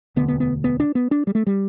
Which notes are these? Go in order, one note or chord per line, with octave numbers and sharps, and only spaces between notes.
E1 D2 D3 B3
B3
B3
B3
D4
B3
D4
G3
A3
G3